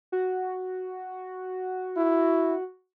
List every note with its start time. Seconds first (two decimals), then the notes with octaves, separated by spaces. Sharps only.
0.12 F#4
1.97 E4